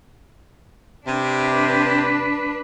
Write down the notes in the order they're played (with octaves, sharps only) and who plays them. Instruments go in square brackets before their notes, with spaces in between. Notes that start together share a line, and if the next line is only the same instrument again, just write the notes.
[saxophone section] C3 [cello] D4 B4